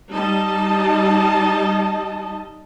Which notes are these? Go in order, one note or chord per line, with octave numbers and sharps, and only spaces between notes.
G3 D#4 D#5 A5